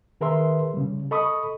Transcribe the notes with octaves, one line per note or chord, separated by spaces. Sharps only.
D#3 G#4 A#4 B4 E5 C6
C#3 G3
A4 D#5 B5 C#6 D#6